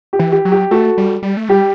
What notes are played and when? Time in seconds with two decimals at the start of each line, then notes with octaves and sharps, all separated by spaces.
0.13 G4
0.19 E3
0.32 G4
0.45 F#3
0.52 G4
0.71 A3 F#4 A4
0.98 G3
1.23 G3
1.37 A3
1.49 G3 G4